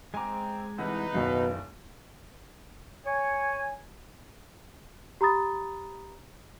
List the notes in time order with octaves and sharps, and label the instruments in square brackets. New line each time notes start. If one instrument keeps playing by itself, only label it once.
[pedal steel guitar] G#3 A#5 [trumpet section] C4 [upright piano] G#5 D6
[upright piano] C2 E3 F#5 [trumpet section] D#4 B4
[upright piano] F#1 D#2 [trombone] B2 [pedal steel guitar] F5
[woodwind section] C#5 G#5
[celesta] G4 A#5 B5 D#6 A6